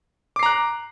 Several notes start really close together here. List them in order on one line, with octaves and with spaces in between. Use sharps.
D6 C7 A#5 F#6